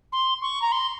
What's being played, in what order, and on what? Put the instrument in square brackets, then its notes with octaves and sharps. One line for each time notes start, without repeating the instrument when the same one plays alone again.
[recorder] C6
C#6
A#5
C6